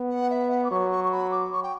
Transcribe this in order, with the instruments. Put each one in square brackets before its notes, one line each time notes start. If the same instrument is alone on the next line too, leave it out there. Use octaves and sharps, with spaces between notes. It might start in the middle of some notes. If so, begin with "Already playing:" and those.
Already playing: [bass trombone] B3
[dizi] F#5
E5
F#5
D6
[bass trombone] F#3 [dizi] C#6
[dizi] C#6
C#6
B5
D6
C#6
G5